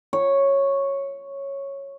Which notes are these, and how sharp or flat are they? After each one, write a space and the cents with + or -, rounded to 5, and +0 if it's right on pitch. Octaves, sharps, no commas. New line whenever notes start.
C#5 -5